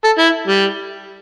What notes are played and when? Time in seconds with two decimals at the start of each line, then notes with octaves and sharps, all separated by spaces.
0.04 A4
0.18 E4
0.47 G3